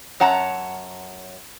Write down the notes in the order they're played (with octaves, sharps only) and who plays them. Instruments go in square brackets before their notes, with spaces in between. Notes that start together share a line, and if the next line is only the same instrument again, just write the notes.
[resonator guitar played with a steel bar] F#2 C#5 F#5 A5 A#5